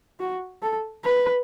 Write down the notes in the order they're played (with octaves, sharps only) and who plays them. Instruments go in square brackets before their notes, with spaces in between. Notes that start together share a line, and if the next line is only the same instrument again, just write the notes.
[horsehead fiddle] F#4
A4
B4